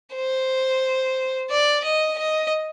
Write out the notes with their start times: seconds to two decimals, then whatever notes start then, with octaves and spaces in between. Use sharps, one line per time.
0.16 C5
1.50 D5
1.84 D#5
2.18 D#5